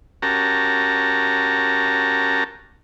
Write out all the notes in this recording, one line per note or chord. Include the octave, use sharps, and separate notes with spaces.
C#4 F#4 G4 A#4 A5 A#5